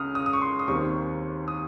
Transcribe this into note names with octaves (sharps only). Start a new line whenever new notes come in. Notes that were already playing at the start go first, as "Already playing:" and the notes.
Already playing: C#2 C#3 D#6 F6
D#6
D#6
C#6
C6
D#6
D#2 D#3 G3 C4 C#6
D#6